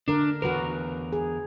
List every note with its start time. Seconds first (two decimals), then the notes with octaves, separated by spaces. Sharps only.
0.08 D3 D4 A#4
0.42 E2 C3 F#4 A#4 B4
1.13 G#4